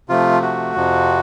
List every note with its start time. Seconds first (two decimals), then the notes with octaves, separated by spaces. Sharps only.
0.09 C3 F3 A3 F4
0.42 F#4
0.76 F2 C3 F3